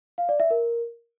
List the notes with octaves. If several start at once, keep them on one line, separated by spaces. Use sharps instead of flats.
F5
D5
E5
A#4